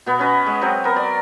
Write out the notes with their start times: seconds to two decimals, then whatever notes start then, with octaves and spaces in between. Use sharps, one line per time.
0.06 B2 B3
0.19 C#4 B4 D#5
0.46 G#3
0.61 F#3 C4
0.84 B3 A#4
0.96 D5